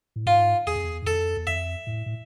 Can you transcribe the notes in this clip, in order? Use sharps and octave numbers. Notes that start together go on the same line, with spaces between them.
A2
G#2 F4
E2 G#4
F2
E2
G#2
F2 A4
E2
F2 E5
A2
A2